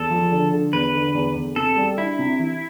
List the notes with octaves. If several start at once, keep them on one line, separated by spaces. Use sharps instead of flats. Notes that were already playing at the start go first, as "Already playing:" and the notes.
Already playing: E2 A4
F3
D3
D3
E2 B4
D3
E2
E2
C3 A4
G3
D4 E4
C3
E3